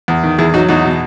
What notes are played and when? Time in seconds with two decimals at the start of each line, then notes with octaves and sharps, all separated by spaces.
0.08 E2
0.23 D#3
0.39 E2 E4 G#4
0.54 F#3 D#4 F#4
0.69 E2 D#4 F#4
0.85 B2